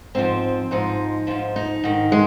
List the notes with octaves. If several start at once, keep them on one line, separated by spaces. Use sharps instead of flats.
G#2 F3 C4
G#2 F3 D#4
G#2 F3 F4
D#4
G#2 D#3
G#3